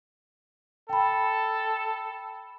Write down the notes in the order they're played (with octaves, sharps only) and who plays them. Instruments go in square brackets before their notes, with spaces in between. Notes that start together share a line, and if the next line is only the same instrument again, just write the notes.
[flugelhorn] A4 [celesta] G5 B5